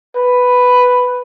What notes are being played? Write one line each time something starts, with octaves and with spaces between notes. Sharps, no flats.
B4